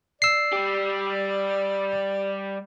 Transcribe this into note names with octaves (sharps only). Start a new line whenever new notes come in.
D5 E6 C7
G3 G4